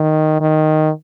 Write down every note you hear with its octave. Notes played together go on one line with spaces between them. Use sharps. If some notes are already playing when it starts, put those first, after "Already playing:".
Already playing: D#3
D#3